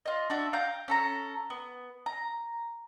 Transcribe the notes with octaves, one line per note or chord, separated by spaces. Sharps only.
F4 D#5
D4 F#4 E5
F5 G5 A#5 G6
C#4 A4 A#5
B3
A#5